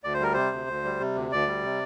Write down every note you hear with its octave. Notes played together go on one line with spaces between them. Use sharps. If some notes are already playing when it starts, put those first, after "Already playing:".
D2 D5
C5
G3 A#4
C3 C5
D2
D2
G3
C3
D2
D2 D5
G3
C3